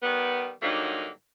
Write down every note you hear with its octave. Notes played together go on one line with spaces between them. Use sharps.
D#3 G3 B3
G2 D3 F#3 A#3 D#4